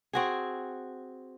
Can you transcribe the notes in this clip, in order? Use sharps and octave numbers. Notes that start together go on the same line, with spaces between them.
C4 F#4 G#4